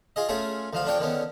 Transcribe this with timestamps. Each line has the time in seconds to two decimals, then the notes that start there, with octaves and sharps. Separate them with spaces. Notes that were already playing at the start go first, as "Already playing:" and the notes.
0.16 F4 G#4 D#5
0.28 A3 C#4 F4 G#4
0.73 D2 F3 F4
0.86 F2 D4 F4 C#5 G5
0.99 D3 D#3 B3 C#4